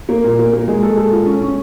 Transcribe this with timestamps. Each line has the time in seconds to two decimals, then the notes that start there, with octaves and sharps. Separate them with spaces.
0.09 A#3
0.24 A#2
0.39 A#3
0.53 A#3
0.68 G#3
0.83 A4
0.97 A4
1.12 F4
1.26 C#4
1.41 C#4